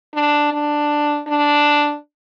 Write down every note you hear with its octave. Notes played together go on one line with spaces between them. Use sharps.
D4
D4
D4